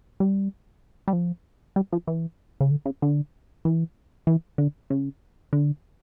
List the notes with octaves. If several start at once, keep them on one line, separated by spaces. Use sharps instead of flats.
G3
G3
F3
G3
F3
E3
C#3
D3
C#3
D3
E3
E3
D3
C#3
D3